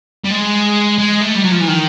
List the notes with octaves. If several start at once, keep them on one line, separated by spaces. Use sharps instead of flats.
G3
G#3
G#3
A3
G3
F#3
F3
E3
D#3